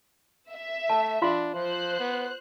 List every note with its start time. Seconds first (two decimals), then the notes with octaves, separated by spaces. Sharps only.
0.51 E5
0.90 A3 A5
1.22 D4 F4 F5 C6
1.55 F3 C5 F#6
1.99 B3